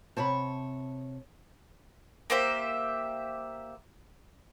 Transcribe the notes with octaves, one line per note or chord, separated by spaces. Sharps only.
C3 C4 C#5 A5 B5
A#3 G4 C5 E5